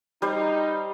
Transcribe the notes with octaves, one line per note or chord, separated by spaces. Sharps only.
G3 D#4 C5